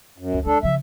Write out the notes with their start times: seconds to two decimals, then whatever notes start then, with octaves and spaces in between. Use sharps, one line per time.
0.18 F#2
0.34 D2
0.46 G#3 D4 A4
0.63 C#3 F3 E5